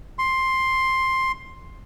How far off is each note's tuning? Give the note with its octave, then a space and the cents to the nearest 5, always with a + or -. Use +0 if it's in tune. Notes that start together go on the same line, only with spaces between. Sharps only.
C6 +10